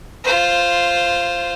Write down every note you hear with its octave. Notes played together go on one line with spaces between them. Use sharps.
F4 C5